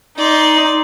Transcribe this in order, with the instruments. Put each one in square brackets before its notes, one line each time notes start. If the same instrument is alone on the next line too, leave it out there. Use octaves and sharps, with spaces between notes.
[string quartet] D#4 [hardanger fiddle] D5 C6